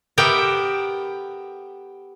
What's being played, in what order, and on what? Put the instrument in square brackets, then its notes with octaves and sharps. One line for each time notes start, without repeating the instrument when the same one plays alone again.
[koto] B3 G4 A4 A#4 E5 G5